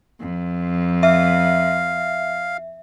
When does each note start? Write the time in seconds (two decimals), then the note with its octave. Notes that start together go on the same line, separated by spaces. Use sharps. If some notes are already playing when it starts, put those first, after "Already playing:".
0.20 F2
1.03 E5 F5